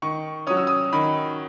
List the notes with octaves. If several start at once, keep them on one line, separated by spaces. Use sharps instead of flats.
D#3 C#6
F#3 C#4 D#6
E6
D#6
D#3 B5